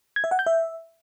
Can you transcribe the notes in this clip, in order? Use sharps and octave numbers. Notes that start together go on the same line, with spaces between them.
G#6
E5
F#5
G6
E5